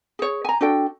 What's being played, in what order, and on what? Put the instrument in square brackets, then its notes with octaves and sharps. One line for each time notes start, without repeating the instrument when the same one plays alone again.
[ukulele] G#4 C#5
G#5 A#5
D4 F#4 A4 G5